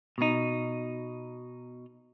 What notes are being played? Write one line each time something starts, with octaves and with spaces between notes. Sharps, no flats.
B2 D#4